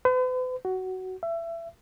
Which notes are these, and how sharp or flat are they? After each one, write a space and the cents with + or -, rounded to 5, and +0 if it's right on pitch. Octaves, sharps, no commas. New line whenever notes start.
B4 +45
F#4 +15
E5 +25